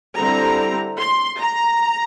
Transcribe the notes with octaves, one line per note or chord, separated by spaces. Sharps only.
D3 G3 C4 E4 A#5
C6
A#5